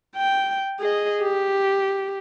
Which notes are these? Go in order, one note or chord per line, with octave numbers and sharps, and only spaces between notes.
G5
G#4 D#5
G4